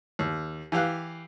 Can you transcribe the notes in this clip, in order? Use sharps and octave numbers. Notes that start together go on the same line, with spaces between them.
D#2
E3 G4 F5 F#6